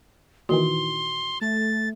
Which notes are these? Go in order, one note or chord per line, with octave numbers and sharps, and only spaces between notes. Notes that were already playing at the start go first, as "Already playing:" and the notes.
A#2 D#3 E3 F#4 C6
A3 A6